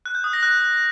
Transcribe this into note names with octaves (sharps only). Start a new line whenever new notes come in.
F#6
G6
D#6
A#6
F#6